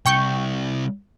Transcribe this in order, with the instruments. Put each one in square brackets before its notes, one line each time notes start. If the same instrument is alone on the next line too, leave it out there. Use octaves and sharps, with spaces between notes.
[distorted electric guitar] C2 [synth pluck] G5 C#6 G6